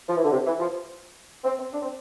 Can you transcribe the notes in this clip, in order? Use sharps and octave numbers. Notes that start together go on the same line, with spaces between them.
F3
E3
D3
C3
E3
F3
C4
C4
D4
C4